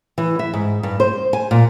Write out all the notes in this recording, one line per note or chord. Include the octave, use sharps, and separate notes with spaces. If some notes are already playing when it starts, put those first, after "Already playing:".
E3
E5
G#2
G2
C5
G#5
A#2